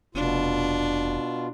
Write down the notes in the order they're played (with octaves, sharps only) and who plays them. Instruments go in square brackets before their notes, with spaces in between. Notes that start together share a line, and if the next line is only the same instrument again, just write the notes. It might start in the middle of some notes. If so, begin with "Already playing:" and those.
[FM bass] F1 [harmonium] B2 F4 [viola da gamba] D4